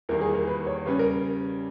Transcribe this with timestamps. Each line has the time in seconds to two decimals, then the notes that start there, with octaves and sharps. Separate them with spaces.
0.09 E2 D#3 G3 A#3 A#4
0.21 G#4
0.34 A#4
0.47 B4
0.66 C#5
0.86 C#3 G3 C#4 B4
0.99 A#4